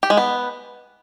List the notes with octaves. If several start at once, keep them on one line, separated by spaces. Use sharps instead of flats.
G4
G#3
B3